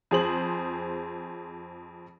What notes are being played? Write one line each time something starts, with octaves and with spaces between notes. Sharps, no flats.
F2 G#4 C5 F#7